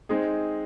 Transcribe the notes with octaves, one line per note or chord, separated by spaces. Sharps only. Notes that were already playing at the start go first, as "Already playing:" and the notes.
G#3 C4 D#4 G#4